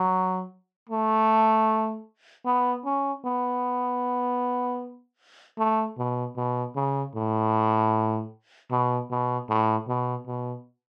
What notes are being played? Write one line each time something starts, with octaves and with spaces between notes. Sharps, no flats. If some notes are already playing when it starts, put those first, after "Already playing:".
Already playing: F#3
A3
B3
C#4
B3
A3
B2
B2
C#3
A2
B2
B2
A2
B2
B2